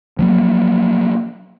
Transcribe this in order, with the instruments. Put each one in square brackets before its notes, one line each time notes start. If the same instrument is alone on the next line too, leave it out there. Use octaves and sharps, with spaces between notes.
[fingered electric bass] F3 F#3 A#3